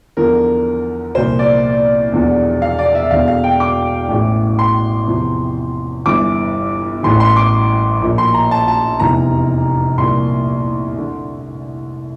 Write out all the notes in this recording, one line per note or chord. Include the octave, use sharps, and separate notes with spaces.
E2 D3 F3 A#4
C2 A#2 F3 C5
D5
E1 E2 D3 F3
F5
D5
E5
E1 E2 D3 F5
F5
G5
D6
A1 A2 E3
C6
E2 C3 F3
G1 G2 E3 D6
A1 A2 E3 C6
C6
D6
A#1 A#2 F3
C6
A#5
A5
A5
F1 E2 C3 E3 A#5
C2 A#2 F3 C6
D3